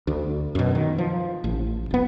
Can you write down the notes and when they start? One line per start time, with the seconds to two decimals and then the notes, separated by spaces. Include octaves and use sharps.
0.07 D2
0.55 F#2 B2
0.75 D#3
0.98 F3
1.44 A1
1.91 D1 B3